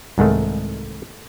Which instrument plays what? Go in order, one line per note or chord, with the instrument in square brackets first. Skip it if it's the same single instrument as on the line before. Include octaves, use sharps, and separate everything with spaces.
[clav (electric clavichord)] C2 G#2 D#3 A3